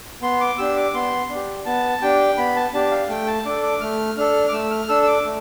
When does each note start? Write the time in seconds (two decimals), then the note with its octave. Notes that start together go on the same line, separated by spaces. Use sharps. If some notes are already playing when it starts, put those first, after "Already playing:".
0.22 B3 C6
0.41 D6
0.58 D4 G4 E6
0.76 D6
0.94 B3 C6
1.30 D4
1.35 G4
1.66 B3 A5
2.02 D4 G4 G5
2.37 B3 B5
2.56 A5
2.74 D4 G4 A5
2.91 F5
3.09 A3 G5
3.27 A5
3.45 D4 A4 D6
3.63 D6
3.81 A3 F6
4.17 D4 A4 F6
4.48 D6
4.53 A3 E6
4.71 F6
4.89 D4 A4 E6
5.03 E6
5.07 D6
5.25 A3